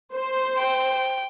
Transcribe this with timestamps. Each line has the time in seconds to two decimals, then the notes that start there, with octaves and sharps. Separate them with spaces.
0.14 C5
0.59 G5